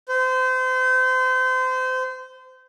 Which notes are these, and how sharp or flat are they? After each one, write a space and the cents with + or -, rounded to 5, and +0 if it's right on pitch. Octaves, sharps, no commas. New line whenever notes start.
C5 -30